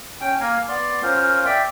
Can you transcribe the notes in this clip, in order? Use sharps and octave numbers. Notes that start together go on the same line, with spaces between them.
C#4 G5
A#3 F5 G#5 A#5
B3 D5 C6
C#4 F4 A#4 C5
D5 E5 G5